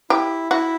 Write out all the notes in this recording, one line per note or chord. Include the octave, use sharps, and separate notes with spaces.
E4 G4
E4 F#4